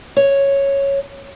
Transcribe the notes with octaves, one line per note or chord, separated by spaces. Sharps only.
C#5